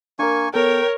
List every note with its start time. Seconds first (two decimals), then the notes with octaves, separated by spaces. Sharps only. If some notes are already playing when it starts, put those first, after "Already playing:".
0.19 A#3 D4 A#4 G#5 C#6
0.54 B3 A4 A#4 C#5 G5